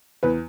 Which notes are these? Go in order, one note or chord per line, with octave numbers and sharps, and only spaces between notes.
E2 B4